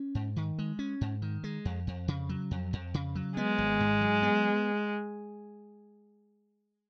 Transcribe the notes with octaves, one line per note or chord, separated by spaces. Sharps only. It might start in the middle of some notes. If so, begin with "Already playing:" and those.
Already playing: C#4
G#2
D#3
G#3
C#4
G#2
D#3
G#3
F2
F2
C#3
F#3
F2
F2
C#3
F#3
G#3 B3
G#1
G#2
F#3
B3